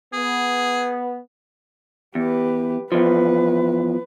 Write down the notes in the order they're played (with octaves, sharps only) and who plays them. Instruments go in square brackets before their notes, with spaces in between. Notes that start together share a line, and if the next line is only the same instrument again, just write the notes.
[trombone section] B3 [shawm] G#4
[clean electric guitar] E2 [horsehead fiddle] G4 B4
[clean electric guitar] E2 F3 [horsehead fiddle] B4